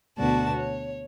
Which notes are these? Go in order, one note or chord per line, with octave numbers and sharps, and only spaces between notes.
D2 B2 B3 F#4 D5 A5
C#5